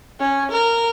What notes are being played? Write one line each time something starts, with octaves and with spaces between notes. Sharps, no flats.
C#4
A#4